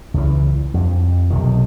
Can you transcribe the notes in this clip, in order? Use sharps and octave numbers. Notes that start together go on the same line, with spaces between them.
C#2 E3
F2
B1 C3 D#3